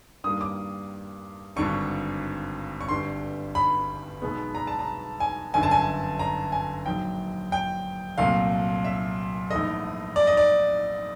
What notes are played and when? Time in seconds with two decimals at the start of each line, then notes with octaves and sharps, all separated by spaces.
0.24 G2 D#3 G3 A#3 D#6
0.41 D6
1.56 G#1 G2 D3 C#6
2.81 C#6
2.89 G1 G2 D3 G3 C6
3.55 B5
4.22 B1 B2 G#3 B3
4.55 A#5
4.67 A5
4.79 A#5
5.20 G#5
5.54 G1 F#2 D3 G#5
5.63 A5
5.71 G#5
6.19 A#5
6.52 G#5
6.86 A#1 G#2 D#3 F#3 G5
7.52 G5
8.18 C2 A#2 F#3 A3 F5
8.85 E5
9.50 A#1 G#2 E3 A3 D#5
10.16 D5
10.27 D#5
10.37 D5